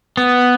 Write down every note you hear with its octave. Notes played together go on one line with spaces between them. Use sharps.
B3